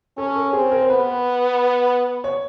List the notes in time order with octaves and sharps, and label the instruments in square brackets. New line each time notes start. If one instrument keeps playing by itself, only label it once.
[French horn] C#4 [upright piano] A4
[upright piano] A#4
[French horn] C4 [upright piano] G#4
[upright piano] A#4
C5
[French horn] B3 [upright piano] B4
[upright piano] C#5